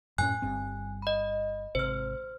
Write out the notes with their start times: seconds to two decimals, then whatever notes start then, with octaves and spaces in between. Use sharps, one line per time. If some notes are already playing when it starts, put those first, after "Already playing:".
0.18 F#2 A2 C#4 G#5 F#6
0.42 G1 G2 C4
1.02 D#5 B5
1.75 G#1 C3 C5 F6